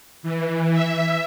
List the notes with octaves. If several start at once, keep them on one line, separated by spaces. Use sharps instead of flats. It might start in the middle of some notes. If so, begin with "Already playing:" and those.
E3
E5